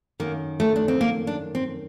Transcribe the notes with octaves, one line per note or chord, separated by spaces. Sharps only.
F#2 D#3 A#3
A3
D4
C4
A#3
D4
C4